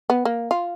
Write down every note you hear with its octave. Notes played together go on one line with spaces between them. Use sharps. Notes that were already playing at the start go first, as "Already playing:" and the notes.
B3
A#3
F4